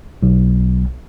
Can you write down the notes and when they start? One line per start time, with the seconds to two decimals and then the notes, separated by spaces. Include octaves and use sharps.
0.23 B1